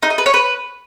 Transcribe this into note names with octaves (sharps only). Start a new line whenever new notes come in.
D#4
D#5
B4
C#5
B4